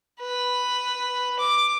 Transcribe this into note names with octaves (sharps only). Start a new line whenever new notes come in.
B4
D6